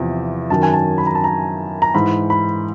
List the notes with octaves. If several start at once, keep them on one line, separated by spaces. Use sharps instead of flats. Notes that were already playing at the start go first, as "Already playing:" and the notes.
Already playing: E2 C3 F3
F#2 D#3 F#3 A5
G#5
A5
B5
A#5
A5
A#5
A#5
G#2 E3 B5
B5